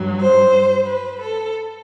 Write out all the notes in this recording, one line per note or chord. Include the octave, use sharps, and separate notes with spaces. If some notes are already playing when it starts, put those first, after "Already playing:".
Already playing: G2 F#3
C5
B4
A4